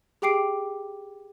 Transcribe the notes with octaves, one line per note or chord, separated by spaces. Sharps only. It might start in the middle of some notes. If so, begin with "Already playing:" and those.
G4 G#4 G5 D6 C7 D7